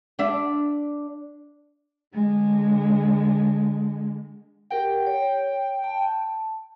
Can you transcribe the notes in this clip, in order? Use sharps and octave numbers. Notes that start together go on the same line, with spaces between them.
D4 E5
D3 G#3
G4 A#4 F#5 G5
C#5
A5